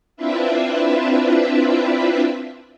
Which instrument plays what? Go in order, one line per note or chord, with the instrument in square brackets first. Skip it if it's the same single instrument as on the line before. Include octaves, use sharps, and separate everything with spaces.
[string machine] C4 D4 E4 F4 B4 E5